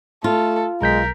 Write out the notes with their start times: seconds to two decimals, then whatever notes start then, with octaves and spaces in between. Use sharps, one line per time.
0.24 A3 F4 A4
0.82 B1 G#3 A#4 G6 B6